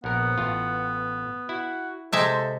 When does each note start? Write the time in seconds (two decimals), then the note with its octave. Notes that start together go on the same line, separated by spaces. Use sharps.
0.04 A#1 B3 A#4 F#5
0.38 A1 F4
1.49 E4 F#4
2.13 C3 G#3 A4 C5 E5